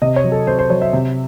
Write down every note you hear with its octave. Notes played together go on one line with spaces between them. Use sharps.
C3 D#5
C#5
F#3
A4
C3 C5
C5
F#3 C#5
E5
C3